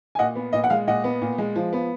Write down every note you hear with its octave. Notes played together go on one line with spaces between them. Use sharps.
G#5
A#2 D#5 F#5
B3
A#2 D#5
F#5
G#3 F5
A#2 D#5 F#5
B3
A#2
G#3
F3
B3